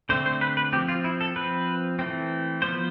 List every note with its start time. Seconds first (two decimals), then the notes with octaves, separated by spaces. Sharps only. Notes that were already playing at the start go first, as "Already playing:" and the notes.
0.09 D3 A3 C4 C5
0.26 C5
0.41 B4
0.57 B4
0.73 F3 C4 G4
0.89 F4
1.04 E4
1.21 A4
1.36 F3 C4 B4
1.99 E3 A3 C4
2.62 F3 B3 C5